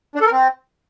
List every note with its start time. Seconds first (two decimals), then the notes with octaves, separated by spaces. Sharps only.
0.15 D4
0.21 A4
0.26 A#4
0.32 C4